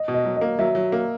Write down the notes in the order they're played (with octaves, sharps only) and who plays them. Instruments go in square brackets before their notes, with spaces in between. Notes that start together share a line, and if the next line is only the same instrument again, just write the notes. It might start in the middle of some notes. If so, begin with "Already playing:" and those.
Already playing: [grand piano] D#5
[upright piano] B2
[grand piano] D#5
[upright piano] F#3
[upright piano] A#3 [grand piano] D#5
[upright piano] F#3 [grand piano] E5
[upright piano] F#3
A#3